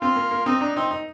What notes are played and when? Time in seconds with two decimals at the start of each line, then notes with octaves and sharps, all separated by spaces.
0.02 C4 F4
0.16 A#3
0.31 A#3
0.46 C4 D#4
0.61 D4 D#4
0.76 C4 D#4
0.91 D#4